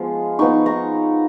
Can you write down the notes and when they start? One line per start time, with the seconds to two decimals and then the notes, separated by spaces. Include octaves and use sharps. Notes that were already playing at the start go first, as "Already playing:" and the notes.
Already playing: F3 G#3 B3
0.39 F3 B3 D#4 C#6
0.66 A#5 C#6